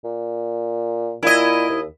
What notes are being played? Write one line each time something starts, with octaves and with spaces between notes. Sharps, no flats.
A#2
A#2 E4 D#5
D#2